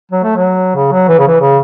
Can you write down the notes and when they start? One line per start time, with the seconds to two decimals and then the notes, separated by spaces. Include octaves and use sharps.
0.11 F#3
0.24 A3
0.36 F#3
0.76 C#3
0.92 F#3
1.09 E3
1.19 C#3
1.28 E3
1.41 C#3